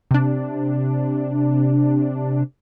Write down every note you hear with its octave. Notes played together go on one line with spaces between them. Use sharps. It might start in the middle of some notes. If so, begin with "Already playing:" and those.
C3 D4